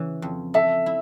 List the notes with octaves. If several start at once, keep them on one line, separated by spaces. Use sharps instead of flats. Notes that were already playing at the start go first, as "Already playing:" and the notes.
Already playing: C#3 E3
F2
A4 E5
E4